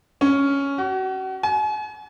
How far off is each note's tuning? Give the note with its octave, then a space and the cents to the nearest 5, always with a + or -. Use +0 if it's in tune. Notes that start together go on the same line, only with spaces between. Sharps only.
C#4 +5
F#4 +35
G#5 +40